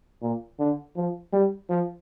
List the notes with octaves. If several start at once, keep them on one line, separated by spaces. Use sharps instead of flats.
A#2
D3
F3
G3
F3